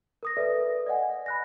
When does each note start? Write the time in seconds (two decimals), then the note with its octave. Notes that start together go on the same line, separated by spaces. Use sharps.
0.23 A#4 D#6 A#6
0.37 A4 B4 D5 E5
0.86 D5 D#5 F#5 G#5
1.26 B5 F#6 A#6